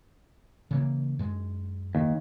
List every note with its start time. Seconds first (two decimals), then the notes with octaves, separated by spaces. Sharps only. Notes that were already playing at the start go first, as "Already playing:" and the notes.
0.71 C#3 E3 A#3
1.19 F#2 G#3
1.95 D#2